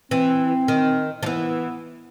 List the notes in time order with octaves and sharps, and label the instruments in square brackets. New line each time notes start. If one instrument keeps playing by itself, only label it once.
[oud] E3 [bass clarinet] C4
[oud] D#3
F3
[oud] E3 [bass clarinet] B3